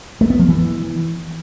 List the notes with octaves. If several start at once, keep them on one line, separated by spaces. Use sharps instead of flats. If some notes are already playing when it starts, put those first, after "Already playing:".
A3
B3
F3
E3